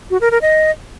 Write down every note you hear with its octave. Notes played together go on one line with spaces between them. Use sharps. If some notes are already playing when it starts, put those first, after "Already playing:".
F#4
A#4
A#4
D#5